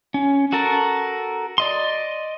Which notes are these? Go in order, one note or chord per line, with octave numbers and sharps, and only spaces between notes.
C#4
F#4 A4 A#4 A5
D5 D#5 C6